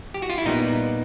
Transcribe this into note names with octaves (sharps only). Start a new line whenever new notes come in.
G4
F#4
F4
E4
A#2 G3 B3 D#4